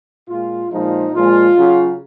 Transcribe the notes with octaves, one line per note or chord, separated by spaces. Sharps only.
A#2 G#3 F4
A#2 F3 G#3 D#4
A#2 F3 G#3 F4
C#3 F#3